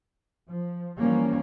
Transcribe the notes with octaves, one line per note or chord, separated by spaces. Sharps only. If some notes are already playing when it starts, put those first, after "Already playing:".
F3
E3 F3 G3 A#3 C#4